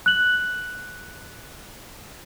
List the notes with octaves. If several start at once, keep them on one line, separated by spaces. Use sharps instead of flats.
F#6 F#7